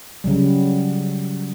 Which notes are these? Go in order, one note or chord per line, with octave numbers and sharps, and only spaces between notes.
C#3 F#3 G3